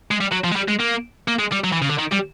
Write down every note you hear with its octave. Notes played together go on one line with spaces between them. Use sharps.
G#3
G3
F#3
F3
G#3
G3
G#3
A#3
A#3
G#3
G3
F#3
E3
C#3
D3
D#3
G3